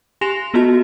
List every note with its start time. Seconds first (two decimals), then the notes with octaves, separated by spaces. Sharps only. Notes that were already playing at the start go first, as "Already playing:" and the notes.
0.21 G4 G#5 C6 A#6 E7 F7
0.54 B3 F4 F#4 D#5 A5